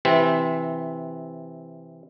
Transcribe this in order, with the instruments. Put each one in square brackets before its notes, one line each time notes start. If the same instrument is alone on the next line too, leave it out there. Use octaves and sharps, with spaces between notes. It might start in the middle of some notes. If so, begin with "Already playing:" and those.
[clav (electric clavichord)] C3 E3 C4